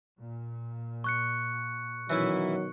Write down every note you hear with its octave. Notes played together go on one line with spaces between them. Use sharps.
A#2
C#6 F#6 C#7
B2 D#3 E3 F#3 C#4 E4